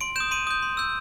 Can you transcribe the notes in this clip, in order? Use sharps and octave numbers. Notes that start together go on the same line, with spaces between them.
C6 D7
D#6 G6 E7
C6 D#7
D#6 G6
C6
E6 G6